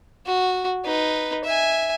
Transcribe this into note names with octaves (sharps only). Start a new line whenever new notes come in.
F#4
D#4 B4
E5 G#5